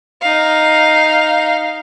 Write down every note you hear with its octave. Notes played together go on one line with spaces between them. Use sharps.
D#4 F5